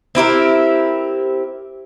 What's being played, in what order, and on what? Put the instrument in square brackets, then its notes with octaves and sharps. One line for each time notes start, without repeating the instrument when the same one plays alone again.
[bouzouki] C4 E4 G4 A#4